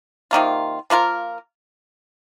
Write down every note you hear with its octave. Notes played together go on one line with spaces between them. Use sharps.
C3 D#3 A#3 F4
F3 A#3 F4 A#4